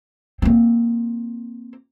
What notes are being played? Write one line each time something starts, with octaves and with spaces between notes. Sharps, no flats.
A#3 C4